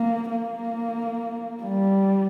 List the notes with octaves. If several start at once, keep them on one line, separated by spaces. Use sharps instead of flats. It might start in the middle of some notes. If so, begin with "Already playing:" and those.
Already playing: A#3
A#3
G3